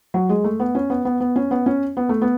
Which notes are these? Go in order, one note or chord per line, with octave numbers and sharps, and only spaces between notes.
F#3
G#3
A3
B3
C#4
B3
B3
B3
C#4
B3
C#4
B3
A3
B3